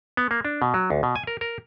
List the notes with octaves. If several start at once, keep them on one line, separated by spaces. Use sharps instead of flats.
B3
A#3
D4
B2
F#3
D2
B2
G#5
A#4
A#4